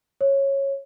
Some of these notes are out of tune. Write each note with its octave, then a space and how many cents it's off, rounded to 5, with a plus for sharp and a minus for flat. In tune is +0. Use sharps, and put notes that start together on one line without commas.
C#5 -15